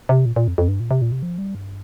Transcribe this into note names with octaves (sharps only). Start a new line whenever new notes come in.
C3
A#2
A#2
F2
F2
G2
A#2
C3
A#2
C3
F3
G3
G2